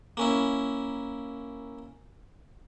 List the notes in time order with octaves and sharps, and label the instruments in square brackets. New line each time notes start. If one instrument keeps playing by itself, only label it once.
[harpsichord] A#3 C#4 E4